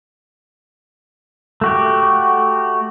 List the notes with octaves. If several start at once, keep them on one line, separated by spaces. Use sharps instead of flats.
A3 F#4 G4